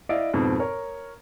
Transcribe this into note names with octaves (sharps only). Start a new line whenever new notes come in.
E4 D5 D#5 F5 D7
F2 G#2 B2 C4
A#4 C#5